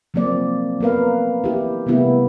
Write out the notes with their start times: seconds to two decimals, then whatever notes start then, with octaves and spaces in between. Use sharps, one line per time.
0.14 F3 F#3 A#3 C4 D5
0.80 A#3 B3 A#4 B4 F5
1.44 E4 G4
1.86 C3 G3 A3 B3 E4 G4